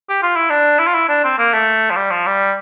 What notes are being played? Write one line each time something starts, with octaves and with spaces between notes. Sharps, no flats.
G4
F4
E4
D4
E4
F4
E4
D4
C4
A#3
A3
F3
G3
F3
G3